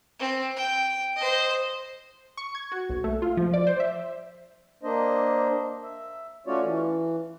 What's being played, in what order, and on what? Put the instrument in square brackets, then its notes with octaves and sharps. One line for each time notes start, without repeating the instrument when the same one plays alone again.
[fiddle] C4
G5
C5 D#5
[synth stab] C#6
G#6
F#4
B1
A3
F4
F3
D5
C5
E5
[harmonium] A#3 D4 C5 D#5
E5
A3 C#4 F4 F#4 C#5 D5
E3